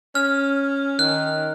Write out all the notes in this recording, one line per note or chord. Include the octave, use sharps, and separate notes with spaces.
C#4 F6
D#3 F#6